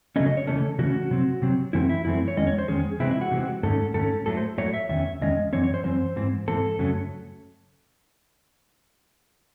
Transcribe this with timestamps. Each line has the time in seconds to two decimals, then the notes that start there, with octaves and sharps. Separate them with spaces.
0.16 C#3 F#3 A3 C#4 D#5
0.26 D#5
0.37 C#5
0.47 C#3 E3 A3 C#4 A4
0.79 C#3 E3 A3 C#4 F#4
1.11 C3 F#3 C4
1.42 C3 F#3 C4
1.73 F#2 E3 A3 C4 E4
1.89 E4
2.05 F#2 E3 A3 C4 E4
2.28 C#5
2.37 E2 D#3 G#3 C#4 D#5
2.47 C#5
2.58 C5
2.68 E2 D#3 G#3 C#4 G#4
3.00 C3 E3 G#3 C4 E4
3.11 E4
3.21 F#4
3.32 C3 E3 G#3 C4
3.63 G#2 D#3 A3 C#4 A4
3.94 G#2 D#3 A3 C#4 A4
4.26 A2 F#3 A3 A4
4.37 C5
4.58 A2 F#3 A3 C#5
4.74 E5
4.89 E2 D#3 C#4 E5
5.21 E2 D#3 G#3 C#4 D#5
5.53 F#2 E3 C4 C#5
5.64 C#5
5.74 C5
5.84 F#2 E3 C4 C5
6.16 G#2 E3 C4
6.48 G#2 E3 C4 A4
6.79 F#2 C#3 F#3 A3 C#4